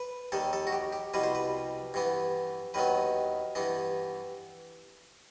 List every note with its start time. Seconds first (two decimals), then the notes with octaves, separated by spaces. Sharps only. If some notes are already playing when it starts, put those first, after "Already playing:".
Already playing: B4
0.32 D#2 D#3 G3 A4
0.53 A4
0.67 F#4
0.73 G4
0.93 G4
1.14 C2 B2 G3 B4
1.23 C5
1.35 B4
1.94 G2 E3 B3
2.74 D#2 D#3 F#3 B3 B4
3.55 G2 E3 B3